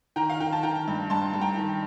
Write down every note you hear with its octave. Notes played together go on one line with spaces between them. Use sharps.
D#3 G5 A#5
F5
D#3 G5
A5
D#3 G5 A#5
G2
G2 A5 C6
G2
G5 A#5
D#3